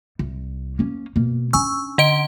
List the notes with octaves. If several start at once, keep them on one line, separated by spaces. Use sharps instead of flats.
C2
A#3 C#4
B2 A#3
C#4 D4 G#5 C#6 E6
D3 D#5 D7